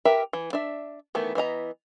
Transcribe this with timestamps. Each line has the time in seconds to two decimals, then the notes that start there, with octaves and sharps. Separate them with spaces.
0.05 G4 A#4 B4 E5
0.33 E3
0.53 D4 E5
1.15 D#3 E3 A3 B3
1.35 E3 B3 D#5 A#5